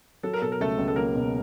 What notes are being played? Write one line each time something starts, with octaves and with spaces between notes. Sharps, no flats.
F#3 A4
A#4
B2 A4
A#4
C#2 A3 A4
C#2
A4
F#3 A#3 A#4
B2